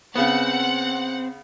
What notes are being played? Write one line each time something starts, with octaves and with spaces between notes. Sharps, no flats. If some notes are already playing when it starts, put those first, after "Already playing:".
C#3 B3 C4 F#5